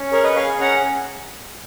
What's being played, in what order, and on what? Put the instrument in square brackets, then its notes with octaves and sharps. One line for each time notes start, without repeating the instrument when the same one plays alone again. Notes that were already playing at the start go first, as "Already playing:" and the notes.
Already playing: [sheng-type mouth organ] C#4
G#4 A#4 C#5
B4 D#5
G#4 C#5 F5
C#4 F#5 A#5